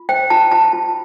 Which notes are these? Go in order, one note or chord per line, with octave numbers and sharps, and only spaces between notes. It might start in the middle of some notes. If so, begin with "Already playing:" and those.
Already playing: F4
C5 G5
F4 A5
F4 A5
F4